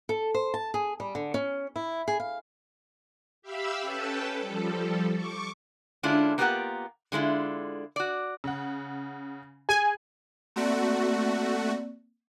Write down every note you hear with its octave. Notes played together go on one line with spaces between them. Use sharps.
A4
C5
A5
G#4
G3
D3
C#4
E4
G#4
F5
G4 E5 F5 B5 E6
C#4 A4 B4 G5 A5
F3 G3 A4
C#6 D6
D3 G#3 C#4 D4 E4 F4
A#3 B3 F4 G4 A#4 F#5
D3 G#3 A3 E4 F4
F#4 D5
C#3 F#5
G#4 G#5
A3 A#3 C4 F#4 D5